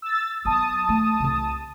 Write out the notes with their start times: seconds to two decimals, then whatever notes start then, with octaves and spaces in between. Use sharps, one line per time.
0.02 E6 A6
0.45 F#3 B3 A5 D#6
0.89 A3
1.20 C2 C3